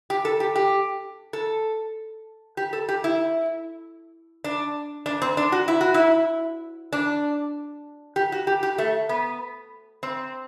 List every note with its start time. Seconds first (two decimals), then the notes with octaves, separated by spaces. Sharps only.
0.10 G4
0.25 A4
0.40 G4
0.55 G4
1.33 A4
2.57 G4
2.73 A4
2.89 G4
3.04 E4
4.44 D4
5.06 D4
5.22 C4
5.37 D4
5.52 F#4
5.68 E4
5.81 F#4
5.94 E4
6.93 D4
8.16 G4
8.32 F#4
8.47 G4
8.63 G4
8.78 A3
9.09 B3
10.03 C4